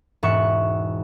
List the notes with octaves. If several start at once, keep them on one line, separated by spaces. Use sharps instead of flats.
E1 G#2 E5 F#5 C#6